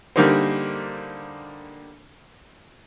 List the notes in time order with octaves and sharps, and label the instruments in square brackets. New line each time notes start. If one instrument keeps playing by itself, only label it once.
[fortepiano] D3 G3 A#3 D#4 A#4 C5